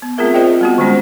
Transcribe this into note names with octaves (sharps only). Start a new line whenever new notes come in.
B3
A3 C4 F4 G#4 A#4 E5
F4 G#4 C5 D5 D#5 G5
G3 B3 F#4
D#3 G#3 C#4 C5